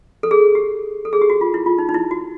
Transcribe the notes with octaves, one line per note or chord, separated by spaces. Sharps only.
A4
G#4
G4
A4
G#4
G4
F#4
F4
E4
F4
D#4
D#4
E4
F#4